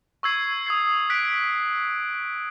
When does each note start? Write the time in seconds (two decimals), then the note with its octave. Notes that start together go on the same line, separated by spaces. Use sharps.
0.23 C#6 E6 G#6 C7
0.66 D#6 G#6 C7
1.10 F#6 B6 D7